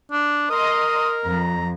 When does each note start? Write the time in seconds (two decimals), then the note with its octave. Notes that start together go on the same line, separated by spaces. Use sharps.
0.12 D4
0.50 A#4 D#5 A#5 C6 D#6
1.25 F2 F3 A#5